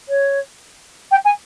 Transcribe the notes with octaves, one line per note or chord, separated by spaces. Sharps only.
C#5
G5
G#5